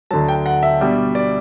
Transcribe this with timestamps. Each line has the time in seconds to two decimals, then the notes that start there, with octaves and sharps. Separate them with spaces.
0.11 D2 D3 F#3 A5
0.29 G5
0.46 F#5
0.63 E5
0.81 B2 G3 D4
1.15 D5